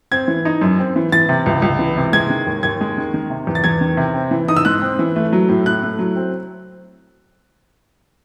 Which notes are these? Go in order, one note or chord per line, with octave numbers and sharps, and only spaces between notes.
C4 G#6
E3
D#4
F#2
C4
E3
E3 A6
C3
C#2
C#2
E3
C3
G#3 G#6
D#3
D#2
D#2 G#6
G#3
D#3
D#3
C3
E2
A6
E2 G#6
D#3
C3
C4
E3
D#4 D#6
E6
G#2 F#6
C4
E3
A3
F#3
A2
A2 F#6
A3
F#3
C4